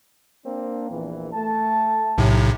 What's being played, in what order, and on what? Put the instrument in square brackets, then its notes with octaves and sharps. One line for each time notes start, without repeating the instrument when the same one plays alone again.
[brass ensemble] A#3 C4 D4
A#1 E2 E3
A3 A5
[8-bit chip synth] B1 A2 C3